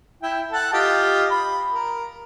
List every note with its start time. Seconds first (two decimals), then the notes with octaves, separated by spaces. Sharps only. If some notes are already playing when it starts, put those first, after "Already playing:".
0.23 E4 G5
0.52 A4 F#5 A5
0.73 F4 G4 D#5
1.30 B5
1.73 A#4